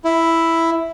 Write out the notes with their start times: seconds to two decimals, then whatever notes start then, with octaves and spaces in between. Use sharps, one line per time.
0.05 E4